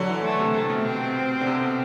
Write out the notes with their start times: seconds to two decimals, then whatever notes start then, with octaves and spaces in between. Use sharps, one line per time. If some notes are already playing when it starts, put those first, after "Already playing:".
Already playing: D3 F#3
0.09 E3
0.24 D3 A3
0.39 C3
0.54 C3 A3
0.70 B2
0.85 C4
1.41 D3
1.47 C3
1.61 B2